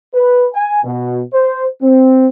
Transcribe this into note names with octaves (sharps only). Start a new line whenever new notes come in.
B4
G#5
B2
C5
C4